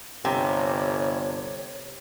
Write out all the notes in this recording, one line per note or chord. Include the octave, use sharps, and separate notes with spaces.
G1 C3 C#5 G5 A#5